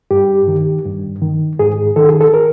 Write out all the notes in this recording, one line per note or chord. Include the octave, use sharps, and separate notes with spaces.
G2 G4
D#3
G2
D#3
G#2 G#4
D#3 A4
G#4
A4
A#4